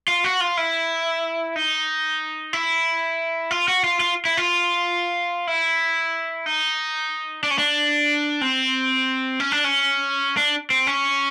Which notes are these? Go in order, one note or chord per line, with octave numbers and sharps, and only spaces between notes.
F4
F#4
F4
E4
D#4
E4
F4
F#4
F4
F4
E4
F4
E4
D#4
D4
C#4
D4
C4
C#4
D4
C#4
D4
C4
C#4